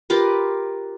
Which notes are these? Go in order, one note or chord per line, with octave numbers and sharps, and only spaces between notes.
F4 G4 A#4 B4